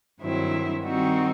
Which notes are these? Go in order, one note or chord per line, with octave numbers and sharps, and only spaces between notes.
G2 D#3 F#3 C4 E4
D#3 G3 C4 D#4 F#4